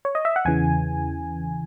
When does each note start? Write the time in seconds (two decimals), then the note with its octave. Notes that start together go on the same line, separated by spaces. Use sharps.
0.05 C#5
0.15 D#5
0.25 E5
0.36 F#5
0.45 E2 C#3 E3 G#5